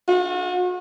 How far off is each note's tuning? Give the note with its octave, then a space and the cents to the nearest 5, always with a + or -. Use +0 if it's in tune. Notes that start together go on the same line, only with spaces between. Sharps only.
F#4 -40